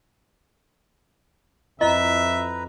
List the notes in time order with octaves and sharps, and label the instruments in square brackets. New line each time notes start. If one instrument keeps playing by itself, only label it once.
[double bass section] F2 [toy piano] E4 D#5 [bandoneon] B4 A#5 [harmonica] E5